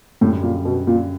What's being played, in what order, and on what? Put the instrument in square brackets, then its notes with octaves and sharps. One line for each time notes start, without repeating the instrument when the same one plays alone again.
[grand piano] F#2 D3 G3 [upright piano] A2
[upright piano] A#2
B2
A#2